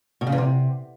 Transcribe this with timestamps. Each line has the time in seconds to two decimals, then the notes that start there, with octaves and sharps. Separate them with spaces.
0.21 B2
0.27 C#3
0.32 E2
0.38 C3